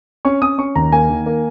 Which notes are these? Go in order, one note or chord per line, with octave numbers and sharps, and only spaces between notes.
C#4 C#6
C#4 D#6
C#4 C#6
D#2 A#5
A#3 G#5
D#3
A#3